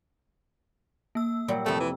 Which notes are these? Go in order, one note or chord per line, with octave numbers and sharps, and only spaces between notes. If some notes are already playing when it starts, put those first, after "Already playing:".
A#3 E6
A#2 F#3 G3
F2 C3 A3
E3